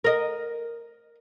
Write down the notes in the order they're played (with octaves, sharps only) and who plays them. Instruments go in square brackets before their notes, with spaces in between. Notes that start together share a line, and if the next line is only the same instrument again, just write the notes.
[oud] A#4 D#5